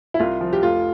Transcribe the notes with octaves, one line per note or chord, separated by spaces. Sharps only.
E4
C2 F4
F3
G4
F1 F4